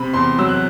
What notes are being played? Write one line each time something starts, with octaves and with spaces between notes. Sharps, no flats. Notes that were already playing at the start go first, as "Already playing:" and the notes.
Already playing: C3 B5
E2 C6
F#3 E6
F#6